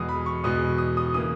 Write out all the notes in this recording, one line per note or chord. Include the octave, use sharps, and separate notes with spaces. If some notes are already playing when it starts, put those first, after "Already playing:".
Already playing: E2 B2 G#3 D#6
B5
C#6
E2 B2 G#3 D#6
D#6
D#6
C#3 E3 A#3 D#6